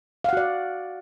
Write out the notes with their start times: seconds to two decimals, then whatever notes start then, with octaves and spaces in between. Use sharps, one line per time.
0.24 F5
0.29 F#5
0.33 F#4
0.37 D5